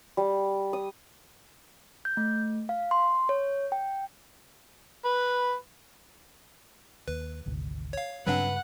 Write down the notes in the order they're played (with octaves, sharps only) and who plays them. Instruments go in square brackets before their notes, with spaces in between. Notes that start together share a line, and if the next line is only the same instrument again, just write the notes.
[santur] G3
D#6
[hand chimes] G6
A3
F5
C6
C#5
G5
[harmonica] B4
[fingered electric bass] D#2 [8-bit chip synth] B4
[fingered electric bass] G#1 D2 C3
[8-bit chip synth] C#5 F5
[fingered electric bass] G2 C#3 G3 [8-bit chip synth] F#3 C4 D4 [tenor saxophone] B4 [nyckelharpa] F#5